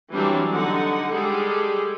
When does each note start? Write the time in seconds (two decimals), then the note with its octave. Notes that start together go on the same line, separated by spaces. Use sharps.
0.14 E3 F#3 G3 C4 D4
0.53 D3 D#4 F#5
1.11 G3 G#3 G#4 A4